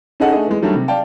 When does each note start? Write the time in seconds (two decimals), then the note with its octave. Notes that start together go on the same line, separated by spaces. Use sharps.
0.20 C#4 D#4 G#4 A4 D#5 F#5
0.33 A3 D4 G#4 D#5
0.47 E3 G#3
0.62 D#3 F#3 G3 A3 D4
0.75 C3
0.88 D5 F5 G5 A5